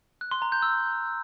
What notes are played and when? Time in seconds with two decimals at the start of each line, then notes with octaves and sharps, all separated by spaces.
0.21 F#6
0.31 C6
0.42 A#5
0.52 G6
0.62 E6